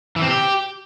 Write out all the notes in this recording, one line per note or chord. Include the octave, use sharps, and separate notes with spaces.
E3
C4
G4